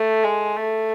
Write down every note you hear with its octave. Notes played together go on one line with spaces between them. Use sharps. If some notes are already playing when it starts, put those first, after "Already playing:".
Already playing: A3
G#3
A3